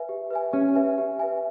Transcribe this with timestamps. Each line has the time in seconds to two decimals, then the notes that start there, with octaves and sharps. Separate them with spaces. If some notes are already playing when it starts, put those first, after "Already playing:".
Already playing: B4 E5 G#5
0.09 G4
0.30 B4 E5 G#5
0.53 C#4 G4
0.75 B4 E5 G#5
0.98 G4
1.19 B4 E5 G#5